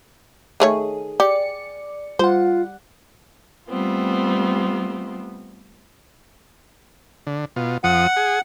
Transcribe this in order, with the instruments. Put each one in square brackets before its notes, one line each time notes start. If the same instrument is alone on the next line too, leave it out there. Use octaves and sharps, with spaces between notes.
[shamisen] D#3 A3 C#5 [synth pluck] G#4
[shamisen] G4 [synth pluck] D5 C#7
[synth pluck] G3 F#5 [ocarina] F4 [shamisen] C5
[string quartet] G3 A3 B3 C4 F4
[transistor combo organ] D3
B2 F4
[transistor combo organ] F2 F3 D#6 [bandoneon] F#5
[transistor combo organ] G#4